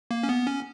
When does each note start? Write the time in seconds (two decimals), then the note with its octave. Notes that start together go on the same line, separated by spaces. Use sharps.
0.11 A#3
0.23 C#4
0.29 B3
0.47 C#4